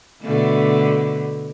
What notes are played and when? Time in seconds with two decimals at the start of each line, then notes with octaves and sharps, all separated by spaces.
0.22 B2 D3 A3